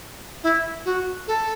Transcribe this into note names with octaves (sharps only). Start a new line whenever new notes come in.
E4
F#4
A4